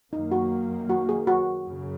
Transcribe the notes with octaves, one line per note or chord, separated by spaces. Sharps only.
F#2 D#3 A#3 D#4
F#4
F#4
G#4
F#4
F#2 C#3 F#3